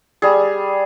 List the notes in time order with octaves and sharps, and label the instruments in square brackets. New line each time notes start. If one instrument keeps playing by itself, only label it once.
[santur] G3 G#4